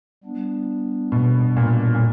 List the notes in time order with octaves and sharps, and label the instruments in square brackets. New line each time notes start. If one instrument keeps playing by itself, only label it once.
[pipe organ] G3 B3 D4
[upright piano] B2
A#2
A#2